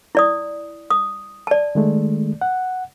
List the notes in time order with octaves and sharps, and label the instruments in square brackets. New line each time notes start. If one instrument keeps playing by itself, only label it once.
[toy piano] E4 D5 D#6
D#6
D5 A5
[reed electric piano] D#3 G#3 A3
F#5